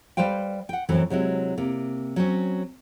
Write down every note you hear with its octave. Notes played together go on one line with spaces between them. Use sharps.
G3 B4 C5 F5 G5
F#5 G5
F#2 A2 E3 F#3 C4
C3 F#3 G#3 E4
C3 A#3
F#3 C4 C#4